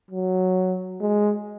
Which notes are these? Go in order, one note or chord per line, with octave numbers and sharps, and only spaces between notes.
F#3
G#3